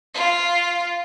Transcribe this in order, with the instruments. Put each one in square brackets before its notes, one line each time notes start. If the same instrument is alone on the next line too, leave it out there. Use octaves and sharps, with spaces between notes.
[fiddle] F4